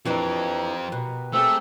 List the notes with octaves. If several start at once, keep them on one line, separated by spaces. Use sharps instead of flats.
F2 E3 F3 C4 D4 G4 A#4
B2
A3 C4 G4 G#4 E6